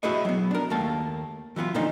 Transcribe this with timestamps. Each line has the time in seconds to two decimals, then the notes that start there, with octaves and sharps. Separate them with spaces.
0.03 E4 F#4 G#4 B4 C#5 D#5
0.25 F#3 B3
0.51 D4 A#4
0.70 D#2 A3 A#3 A5
1.56 E3 F#3 B3 F4
1.75 A#2 D3 F3 D#4